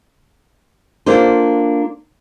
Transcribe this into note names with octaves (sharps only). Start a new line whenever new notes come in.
A#3 D4 F4 A4 C5